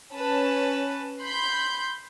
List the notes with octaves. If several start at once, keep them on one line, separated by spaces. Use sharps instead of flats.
C#4 B4 A5
B5 C6 G6